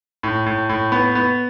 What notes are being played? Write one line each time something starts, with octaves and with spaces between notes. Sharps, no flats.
A2
A2
A2
B3
B3